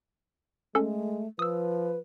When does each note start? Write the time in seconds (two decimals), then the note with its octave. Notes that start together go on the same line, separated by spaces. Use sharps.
0.75 G#3 A3 C#4 A4
1.39 F3 B4 D#6 E6